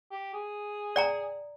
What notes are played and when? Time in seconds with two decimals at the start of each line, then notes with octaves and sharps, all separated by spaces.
0.11 G4
0.33 G#4
0.96 D5 G5 A#5